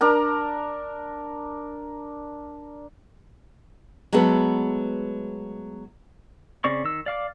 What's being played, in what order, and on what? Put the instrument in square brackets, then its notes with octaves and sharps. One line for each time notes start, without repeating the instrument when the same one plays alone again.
[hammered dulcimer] D4 A#4 A#5
[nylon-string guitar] F#3 G#3 A3 B3 A4
[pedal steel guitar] C#3 C4 D5 C#6
D#3 E6
D5 F5 D6